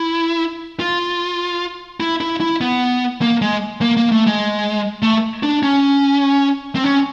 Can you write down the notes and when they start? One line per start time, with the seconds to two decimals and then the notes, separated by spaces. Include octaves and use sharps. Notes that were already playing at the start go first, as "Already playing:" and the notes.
Already playing: E4
0.80 F4
2.00 E4
2.21 E4
2.40 E4
2.61 B3
3.22 A#3
3.42 G#3
3.82 A#3
3.97 A#3
4.12 A3
4.27 G#3
5.02 A3
5.43 D4
5.63 C#4
6.75 C4
6.84 C#4